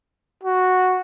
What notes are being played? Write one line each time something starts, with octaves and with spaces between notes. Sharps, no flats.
F#4